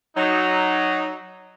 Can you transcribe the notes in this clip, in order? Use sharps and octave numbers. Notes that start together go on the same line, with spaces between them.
F#3 D#4